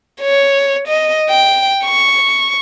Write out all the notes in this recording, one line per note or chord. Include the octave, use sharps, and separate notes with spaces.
C#5
D#5
G5
C#6